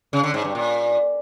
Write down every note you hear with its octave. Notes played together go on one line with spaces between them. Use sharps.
C#3
D3
G#2
G2
A#2